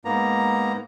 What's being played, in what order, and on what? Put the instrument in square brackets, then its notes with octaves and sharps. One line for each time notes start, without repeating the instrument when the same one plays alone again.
[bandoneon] G#2 A#3 B3 A#5